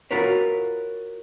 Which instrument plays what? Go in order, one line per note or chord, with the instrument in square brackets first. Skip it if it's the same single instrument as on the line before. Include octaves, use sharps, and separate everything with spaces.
[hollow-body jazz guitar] F4 F#4 A#4 B4 C#5